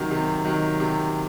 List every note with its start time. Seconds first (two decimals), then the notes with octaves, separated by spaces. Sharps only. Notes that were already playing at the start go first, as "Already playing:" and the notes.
Already playing: C3 D#3 F#3
0.11 C3
0.45 D#3 F#3
0.80 C3